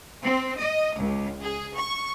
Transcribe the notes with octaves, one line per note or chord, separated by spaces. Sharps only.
C4
D#5
C#2
G#4
C#6